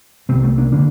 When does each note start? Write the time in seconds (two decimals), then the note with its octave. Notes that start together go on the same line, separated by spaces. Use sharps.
0.29 C3 A3 C4
0.33 C2
0.43 A3 C4
0.58 A#3 D4
0.72 D3 A#3 D4